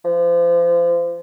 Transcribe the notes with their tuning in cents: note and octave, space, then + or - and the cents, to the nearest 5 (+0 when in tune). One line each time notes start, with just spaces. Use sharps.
F3 -30